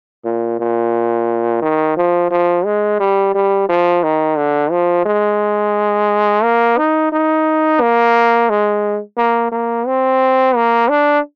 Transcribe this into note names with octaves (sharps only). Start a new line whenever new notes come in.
A#2
A#2
D#3
F3
F3
G#3
G3
G3
F3
D#3
D3
F3
G#3
A#3
D#4
D#4
A#3
G#3
A#3
A#3
C4
A#3
D4